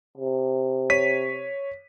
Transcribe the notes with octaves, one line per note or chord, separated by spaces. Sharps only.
C3
C#5 B6 D#7